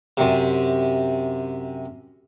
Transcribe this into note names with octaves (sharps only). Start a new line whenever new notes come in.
F#2 C3